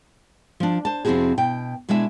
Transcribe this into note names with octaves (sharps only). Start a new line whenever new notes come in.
F3 D4
C5 A5
F2 C3 C4 E4 F#4 G#4
B2 G5
B2 G#3 D4 E4 E5 G#5